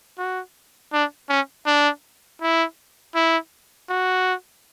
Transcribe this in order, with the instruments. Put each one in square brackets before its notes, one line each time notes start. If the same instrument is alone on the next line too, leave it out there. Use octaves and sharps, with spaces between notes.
[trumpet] F#4
D4
C#4
D4
E4
E4
F#4